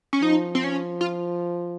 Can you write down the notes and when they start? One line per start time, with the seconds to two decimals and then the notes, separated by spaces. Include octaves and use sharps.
0.13 C#4
0.22 F3 D#4
0.55 C4
0.64 C#4
1.01 F4